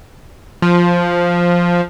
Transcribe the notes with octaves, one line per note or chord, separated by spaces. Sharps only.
F3